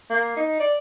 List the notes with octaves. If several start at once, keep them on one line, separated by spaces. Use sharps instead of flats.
A#3
D#4
D5